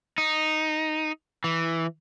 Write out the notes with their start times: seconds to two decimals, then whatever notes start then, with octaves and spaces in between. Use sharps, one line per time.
0.18 D#4
1.44 E3